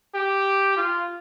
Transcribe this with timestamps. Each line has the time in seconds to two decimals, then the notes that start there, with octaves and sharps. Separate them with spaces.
0.14 G4
0.76 F4